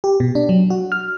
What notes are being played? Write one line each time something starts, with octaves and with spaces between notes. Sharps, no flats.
G4
B2
D4
F#3
F#4
F6